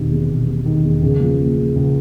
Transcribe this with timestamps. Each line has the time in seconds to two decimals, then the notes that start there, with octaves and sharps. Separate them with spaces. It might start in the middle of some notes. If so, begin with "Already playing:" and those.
Already playing: E1 C3 D#3
0.11 E2
0.29 E1
0.47 C3
0.65 D#3
0.84 E2
1.02 C#2
1.20 F3
1.39 A#3
1.57 C#3
1.75 C#2